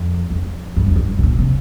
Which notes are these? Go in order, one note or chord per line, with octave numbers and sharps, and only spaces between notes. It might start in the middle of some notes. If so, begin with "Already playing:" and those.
Already playing: F2
F2
G2
F2
G2
C3
A#2
C3